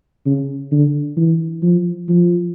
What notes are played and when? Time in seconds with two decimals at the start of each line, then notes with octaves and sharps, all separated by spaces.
0.26 C#3
0.72 D3
1.17 E3
1.63 F3
2.09 F3